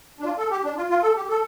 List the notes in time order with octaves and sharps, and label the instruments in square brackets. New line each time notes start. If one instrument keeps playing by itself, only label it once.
[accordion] D4
F4
A4
G4
D4
F4
F4
A4
G4
A4